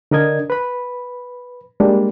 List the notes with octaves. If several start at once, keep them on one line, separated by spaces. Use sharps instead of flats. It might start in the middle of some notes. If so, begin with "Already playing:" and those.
D3 D4 A#4 D#5 G#6
B4 B5
G3 G#3 A#3 D4